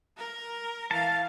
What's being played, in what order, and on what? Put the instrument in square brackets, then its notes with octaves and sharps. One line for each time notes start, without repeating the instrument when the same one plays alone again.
[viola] A#4
[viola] E3 F5 [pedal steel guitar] A5